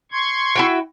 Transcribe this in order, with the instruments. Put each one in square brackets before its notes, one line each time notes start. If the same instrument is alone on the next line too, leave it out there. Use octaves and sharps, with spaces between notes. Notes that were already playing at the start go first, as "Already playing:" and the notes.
[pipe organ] C6 C#6 G#6
[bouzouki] E4 F#4 G5